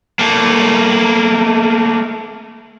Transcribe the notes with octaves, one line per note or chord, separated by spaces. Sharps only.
A3 A#3